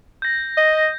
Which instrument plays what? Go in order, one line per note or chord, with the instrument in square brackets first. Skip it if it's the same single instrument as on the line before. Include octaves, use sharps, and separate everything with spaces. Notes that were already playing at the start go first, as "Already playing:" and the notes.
[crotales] G6 A#6
[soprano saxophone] D#5